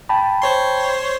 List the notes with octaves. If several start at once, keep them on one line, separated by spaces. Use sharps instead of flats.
G5 A5 B5
C5 C#5 C6